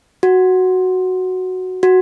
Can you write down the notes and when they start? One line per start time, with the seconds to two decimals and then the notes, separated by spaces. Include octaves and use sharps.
0.23 F#4
1.83 F#4